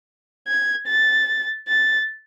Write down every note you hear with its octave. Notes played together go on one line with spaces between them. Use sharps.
G#6
A6
A6